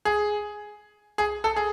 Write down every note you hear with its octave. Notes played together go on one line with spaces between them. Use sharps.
G#4
G#4
A4
G#4